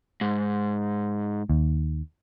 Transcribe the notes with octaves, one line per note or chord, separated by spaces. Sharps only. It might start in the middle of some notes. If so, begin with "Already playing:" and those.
G#2
D#2